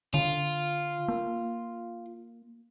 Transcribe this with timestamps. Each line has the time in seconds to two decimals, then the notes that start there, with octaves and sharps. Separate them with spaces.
0.14 D3 F4
1.08 A#3